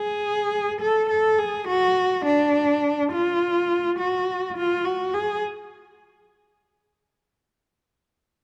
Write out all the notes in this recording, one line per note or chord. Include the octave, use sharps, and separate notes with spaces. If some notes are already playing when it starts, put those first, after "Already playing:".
Already playing: G#4
A4
A4
G#4
F#4
D4
F4
F#4
F4
F#4
G#4